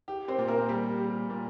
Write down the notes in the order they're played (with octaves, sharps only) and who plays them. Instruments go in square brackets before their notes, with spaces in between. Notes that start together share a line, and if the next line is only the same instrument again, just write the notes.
[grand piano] G4
[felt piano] C4 C5
[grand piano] A#2
[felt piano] A#3 A#4
[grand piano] G3 [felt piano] G4
[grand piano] G3
A#2